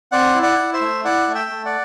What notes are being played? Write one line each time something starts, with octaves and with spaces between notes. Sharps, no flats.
C4 D5 F#5
E4
D5 F#5
E4
C5 E5
A3
E4 D5 F#5
A3
E5 G5
A3
D5 F#5